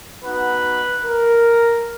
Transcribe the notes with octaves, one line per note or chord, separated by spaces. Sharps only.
B3 D#4 F#4 B4
A#4